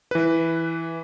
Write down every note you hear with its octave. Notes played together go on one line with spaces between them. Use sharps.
E3 B4